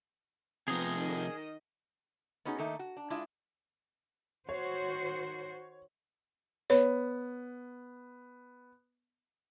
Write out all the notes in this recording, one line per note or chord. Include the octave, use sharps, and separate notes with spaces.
C3 F3 B3 G#4 A#5 D#6
D#3 D#5
B3 C#4 D#4 F#4 G#4
D#3 A3 A#3 D#4
F#4
D4
G#3 D4 E4 F4
D#3 F#4 C5 C#5
B3 C#5